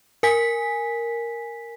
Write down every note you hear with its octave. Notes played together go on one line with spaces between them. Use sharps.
A#4 G#5 B6